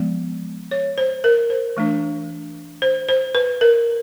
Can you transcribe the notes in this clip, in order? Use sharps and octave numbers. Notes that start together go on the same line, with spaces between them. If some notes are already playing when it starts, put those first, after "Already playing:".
Already playing: F3 G#3 B3
C#5
C5
A#4
C5
E3 A3 D4
C5
C5
B4
A#4